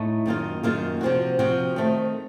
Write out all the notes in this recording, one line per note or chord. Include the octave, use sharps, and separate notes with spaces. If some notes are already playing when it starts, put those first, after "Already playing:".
Already playing: A2 A3 D#4
F#2 D#3 A#3 F4
F#2 D#3 A#3 F4
C3 F3 C4 F#4
C3 F3 C4 F#4
D#3 A3 C4